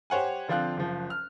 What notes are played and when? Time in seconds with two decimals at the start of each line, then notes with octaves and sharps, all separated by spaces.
0.10 G4 C5 C#5 F#5 G#5
0.49 D3 F3 C4 F4 F5 F#6
0.77 F#1 F3
1.10 F6